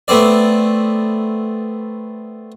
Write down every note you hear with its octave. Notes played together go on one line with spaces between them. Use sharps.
A3 B3 C4 D5